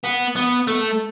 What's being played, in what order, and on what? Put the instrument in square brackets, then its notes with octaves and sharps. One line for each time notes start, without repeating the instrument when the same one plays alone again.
[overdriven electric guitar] B3
B3
A3